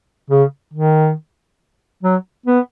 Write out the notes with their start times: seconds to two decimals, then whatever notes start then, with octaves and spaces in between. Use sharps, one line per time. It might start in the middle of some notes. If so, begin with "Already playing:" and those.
0.30 C#3
0.73 D#3
2.03 F#3
2.46 B3